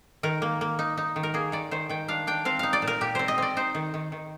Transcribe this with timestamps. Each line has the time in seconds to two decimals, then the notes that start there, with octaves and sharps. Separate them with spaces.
0.23 D#3 A#4
0.42 A#3
0.61 A#3
0.79 D#4
0.97 D#4
1.16 D#3
1.23 A#4
1.34 A#3 G#4
1.52 D#3 D5
1.71 D#3 C5
1.89 D#3 G5
2.08 D4 F5
2.27 D4 G5
2.45 C4 F5
2.59 D#4 F5
2.73 D5
2.82 A#2
2.87 A#4
3.01 A#2 G4
3.15 C4 C5
3.28 D#5
3.38 C4 D5
3.57 D#4 C5
3.75 D#3
3.94 D#3
4.12 D#3